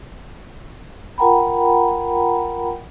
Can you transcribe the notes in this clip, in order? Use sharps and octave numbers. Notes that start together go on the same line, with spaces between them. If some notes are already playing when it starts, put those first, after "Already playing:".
F4 A#4 F#5 G5 A#5 B5